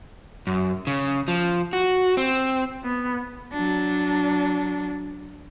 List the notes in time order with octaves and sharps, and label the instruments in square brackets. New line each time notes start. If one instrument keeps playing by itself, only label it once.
[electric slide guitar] F#2
C#3
F3
F#4
C4
[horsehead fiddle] B3
[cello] F#3 D4